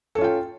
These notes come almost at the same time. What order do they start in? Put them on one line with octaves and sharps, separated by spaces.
A4 C#4 F4 G5